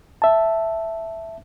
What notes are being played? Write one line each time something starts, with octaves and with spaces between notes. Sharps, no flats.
E5 A5